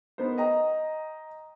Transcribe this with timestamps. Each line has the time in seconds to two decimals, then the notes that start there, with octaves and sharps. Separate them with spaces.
0.18 B3 D#4 A#4 C5
0.38 D#5 G5 A#5